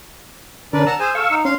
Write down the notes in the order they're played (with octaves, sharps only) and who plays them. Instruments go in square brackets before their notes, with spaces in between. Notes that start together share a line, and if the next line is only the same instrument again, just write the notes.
[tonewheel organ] D3 C#4 A#4 [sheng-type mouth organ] D4 B4 D5
[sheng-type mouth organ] F#5 A5 A#5 [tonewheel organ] E6
[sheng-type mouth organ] G#4 C5 G#5
[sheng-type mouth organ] A4 [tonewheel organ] F5 C#6 E6
[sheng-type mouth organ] D#4
[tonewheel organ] C#4 [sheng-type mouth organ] F5 C6